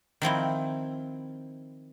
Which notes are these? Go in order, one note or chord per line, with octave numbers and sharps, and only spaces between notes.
D#3 F3 C4 E4